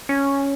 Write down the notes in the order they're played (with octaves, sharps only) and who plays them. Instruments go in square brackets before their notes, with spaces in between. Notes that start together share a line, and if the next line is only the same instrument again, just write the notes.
[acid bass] C#4